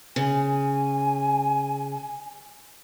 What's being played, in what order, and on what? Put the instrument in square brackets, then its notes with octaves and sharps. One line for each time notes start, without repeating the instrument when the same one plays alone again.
[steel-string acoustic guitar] C#3 [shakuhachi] G#5